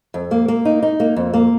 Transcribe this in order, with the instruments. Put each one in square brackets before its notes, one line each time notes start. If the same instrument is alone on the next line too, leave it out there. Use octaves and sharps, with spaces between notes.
[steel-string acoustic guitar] F2
A#3
A#3
D#4
D#4
A#3
F2
A#3